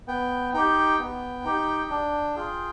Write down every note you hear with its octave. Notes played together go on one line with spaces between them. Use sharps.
B3 G5
D#4 G4 G5
B3
D#4 G4
D4
F4 G#4